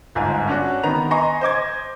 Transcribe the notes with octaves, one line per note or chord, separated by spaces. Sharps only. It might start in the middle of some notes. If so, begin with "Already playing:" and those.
G1 G#2 F4 G#5
C#4 D4 F#4
D#3 B3 A#5 F7
D#5 G#5 A#5 C6 C#6
C5 D#5 D6 G#6